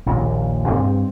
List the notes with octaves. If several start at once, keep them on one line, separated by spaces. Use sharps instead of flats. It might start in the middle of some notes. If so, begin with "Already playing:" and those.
A#1 D#2 A#2
G2 C4